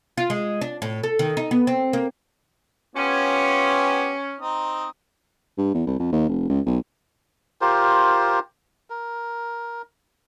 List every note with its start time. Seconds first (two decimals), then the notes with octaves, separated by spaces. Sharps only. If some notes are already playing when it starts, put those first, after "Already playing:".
0.18 F4
0.30 G#3
0.61 D4
0.82 A2
1.03 A4
1.19 D#3
1.37 D#4
1.51 B3
1.67 C4
1.93 A#3
2.96 B3 C#4 F4 G4
4.40 C4 D#4 D#6
5.58 G2
5.74 E2
5.87 C2
5.99 F2
6.12 D#2
6.29 F1
6.49 C#2
6.66 B1
7.61 F4 G4 A#4 C5
8.90 A#4